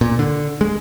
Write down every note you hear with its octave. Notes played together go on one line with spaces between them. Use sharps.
A#2
D3
G#3